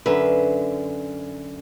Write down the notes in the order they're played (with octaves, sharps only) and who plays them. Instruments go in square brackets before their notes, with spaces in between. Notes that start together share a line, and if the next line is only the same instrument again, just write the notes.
[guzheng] F#2 D3 E5 [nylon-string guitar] B4